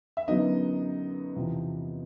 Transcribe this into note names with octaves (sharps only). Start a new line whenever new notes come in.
E5
F#2 D3 F#3 B3 D#4 D#5
E2 C3 F3